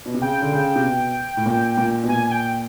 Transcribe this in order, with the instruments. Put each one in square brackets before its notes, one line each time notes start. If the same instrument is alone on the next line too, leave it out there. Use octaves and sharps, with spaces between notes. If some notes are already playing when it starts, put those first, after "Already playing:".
[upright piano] B2
C3
[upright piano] C#3 [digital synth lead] G5
[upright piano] D3
C#3
C3
B2
A2
A#2
A#2
B2
[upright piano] A#2 [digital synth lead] G#5
[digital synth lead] G#5
G5